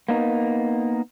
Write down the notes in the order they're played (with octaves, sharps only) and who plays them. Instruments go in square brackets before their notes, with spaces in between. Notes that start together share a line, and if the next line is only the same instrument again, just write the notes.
[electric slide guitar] A#3 B3 D#4